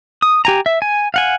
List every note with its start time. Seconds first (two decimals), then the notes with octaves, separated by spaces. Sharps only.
0.22 D#6
0.45 G4 G#5 A#5
0.66 E5
0.82 G#5
1.14 F5 F#5 G#5